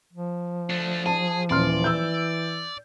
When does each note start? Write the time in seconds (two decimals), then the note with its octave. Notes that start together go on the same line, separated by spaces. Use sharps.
0.13 F3
0.70 A3 D4
1.06 G#4 A5
1.50 D#1 E3 D5 C6 F6
1.84 E6 G6